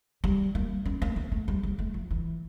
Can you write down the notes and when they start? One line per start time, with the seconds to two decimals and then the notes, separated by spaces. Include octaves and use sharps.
0.24 G3
0.55 A#3
0.85 C#4
1.02 A#3
1.16 A#3
1.32 A3
1.48 G3
1.63 G3
1.79 A3
1.94 F3
2.11 E3